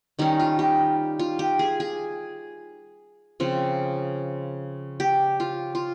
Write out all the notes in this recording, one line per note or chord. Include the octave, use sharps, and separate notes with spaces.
D#3 G3 C#4 D#4
F4
G4
F4
G4
G#4
G#4
C#3 F3 C4
G4
F4
F4